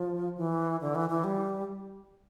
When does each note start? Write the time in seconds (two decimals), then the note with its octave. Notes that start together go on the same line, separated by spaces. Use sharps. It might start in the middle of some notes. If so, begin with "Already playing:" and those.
Already playing: F3
0.37 E3
0.81 D3
0.95 E3
1.10 E3
1.24 G3